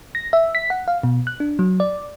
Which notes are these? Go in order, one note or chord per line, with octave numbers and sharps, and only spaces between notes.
A#6
E5
B6
F#5
F5
B2
F#6
D4
F#3
D5